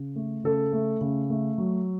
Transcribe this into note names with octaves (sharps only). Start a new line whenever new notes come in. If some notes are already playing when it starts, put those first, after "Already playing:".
Already playing: C#3
A3
C#3 A4
A3
C#3
A3
F#3